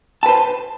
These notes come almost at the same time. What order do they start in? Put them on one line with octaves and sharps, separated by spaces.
A5 B4 C5